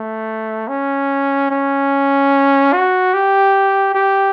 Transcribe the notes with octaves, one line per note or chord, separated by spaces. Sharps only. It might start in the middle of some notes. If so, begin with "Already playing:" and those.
Already playing: A3
C#4
C#4
F#4
G4
G4